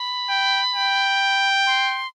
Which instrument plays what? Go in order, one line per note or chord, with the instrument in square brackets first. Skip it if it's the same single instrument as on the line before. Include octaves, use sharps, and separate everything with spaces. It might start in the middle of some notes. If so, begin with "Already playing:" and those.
Already playing: [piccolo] B5
[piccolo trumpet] G5
G5
[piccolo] C6